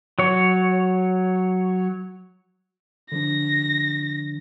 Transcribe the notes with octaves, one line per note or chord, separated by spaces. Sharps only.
F#3 C#5
D3 F3 D4 A#6